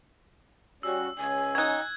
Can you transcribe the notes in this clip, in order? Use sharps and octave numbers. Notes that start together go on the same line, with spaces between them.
G3 C#4 F#4 E6
C#2 C#4 G#5
F#3 D#4 F#6 G#6